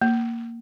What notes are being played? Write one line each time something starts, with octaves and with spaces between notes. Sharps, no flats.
A#3